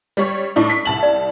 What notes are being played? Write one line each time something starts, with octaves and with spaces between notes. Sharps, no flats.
G3 C#5 C#6
A2 D4 D#4
B6
C2 A5 F#7
D5